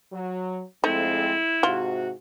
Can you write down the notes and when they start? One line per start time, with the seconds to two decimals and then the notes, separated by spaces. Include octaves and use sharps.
0.13 F#3
0.84 F2 G#3 A3 C4 E4
1.63 G#2 C3 F4 F#4